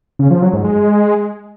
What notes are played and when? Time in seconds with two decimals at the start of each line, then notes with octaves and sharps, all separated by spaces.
0.19 C#3
0.31 F3
0.42 F#3
0.53 G#2
0.64 G#3